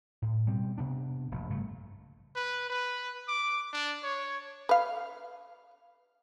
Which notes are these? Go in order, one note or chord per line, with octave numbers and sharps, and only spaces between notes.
A2
B2 G3 C4
C3 B3 D4
F1 A#1
F1 G2 C#3 A3
B4
B4
D6
D4
C#5
B4 F5